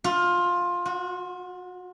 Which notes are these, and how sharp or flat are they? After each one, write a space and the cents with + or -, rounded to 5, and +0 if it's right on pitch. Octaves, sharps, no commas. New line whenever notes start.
F4 +15
F#4 -30